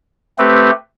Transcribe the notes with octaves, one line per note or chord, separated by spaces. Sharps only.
A3 C4 G4 B4